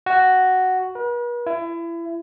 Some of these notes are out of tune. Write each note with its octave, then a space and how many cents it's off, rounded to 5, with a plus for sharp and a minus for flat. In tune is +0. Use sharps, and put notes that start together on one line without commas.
F#4 +5
B4 -45
E4 +30